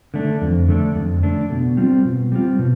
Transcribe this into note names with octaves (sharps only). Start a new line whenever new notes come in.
D3 A3 D4
F2
D3 A3 D4
F2
D3 A3 D4
B2
G3 C4 F4
B2
G3 C4 F4
B2